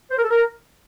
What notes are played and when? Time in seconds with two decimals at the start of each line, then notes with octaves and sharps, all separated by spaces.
0.11 C5
0.17 A#4
0.23 A4
0.30 A#4